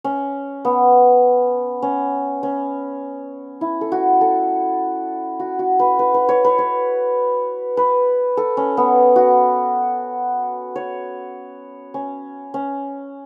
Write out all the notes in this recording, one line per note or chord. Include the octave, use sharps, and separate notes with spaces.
C#4
B3
C#4
C#4
E4
A4
F#4
A4
F#4
F#4
B4
B4
B4
C#5
B4
C#5
B4
A4
C#4
B3
F#4
C#5
C#4
C#4